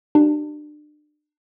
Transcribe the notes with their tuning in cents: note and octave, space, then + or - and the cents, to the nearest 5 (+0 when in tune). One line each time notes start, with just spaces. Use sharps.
D4 +30 G4 -35